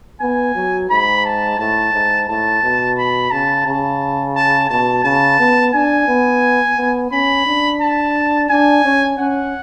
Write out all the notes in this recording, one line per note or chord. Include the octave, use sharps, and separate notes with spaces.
B3 G#5
F#3
G#2 B5
A5
A2 A5
G#2
A2 A5
B2
B5
C#3 A5
C#3 A5
A5
B2 A5
C#3 A5
B3
D4 G#5
B3
B3
C#4 B5
D4
A5
D4 G#5
C#4
C#4 F#5